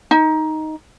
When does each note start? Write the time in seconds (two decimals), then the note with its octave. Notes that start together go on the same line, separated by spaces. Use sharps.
0.11 D#4